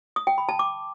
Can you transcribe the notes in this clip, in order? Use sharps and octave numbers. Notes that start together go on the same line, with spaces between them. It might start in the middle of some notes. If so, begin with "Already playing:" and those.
D#6
G5
B5
A5
D6